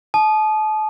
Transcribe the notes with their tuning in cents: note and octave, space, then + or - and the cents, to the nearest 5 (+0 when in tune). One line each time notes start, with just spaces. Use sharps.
A5 -35 D#6 -20